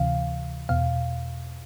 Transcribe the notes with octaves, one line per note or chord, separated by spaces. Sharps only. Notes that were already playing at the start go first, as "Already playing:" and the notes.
Already playing: D2 C3 E3 F5
E2 B2 F5